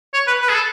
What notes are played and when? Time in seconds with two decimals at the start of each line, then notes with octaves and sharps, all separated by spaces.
0.14 C#5
0.28 B4
0.41 B4
0.49 G#4
0.55 A4